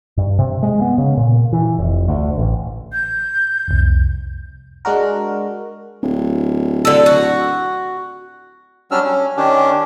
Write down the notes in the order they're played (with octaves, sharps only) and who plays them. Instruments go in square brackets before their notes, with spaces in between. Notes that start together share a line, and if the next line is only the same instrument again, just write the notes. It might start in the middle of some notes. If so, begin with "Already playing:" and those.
[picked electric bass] G2
C3
G#3
B3
C#3
A#2
E3
F1
D2
A1
[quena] G6
[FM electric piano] C2 F2
G#3 D4 F#4 A#4
[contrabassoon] D1
[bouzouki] D3 A4
F#4
[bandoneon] F#3 G3 C#4 D4 E6 F6
C#4
D#3 C#4 D4 G4